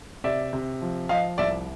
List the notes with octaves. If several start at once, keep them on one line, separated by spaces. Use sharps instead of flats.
C3 D5 E5
C3
F3
F3 D#5 F5
C2 D5 E5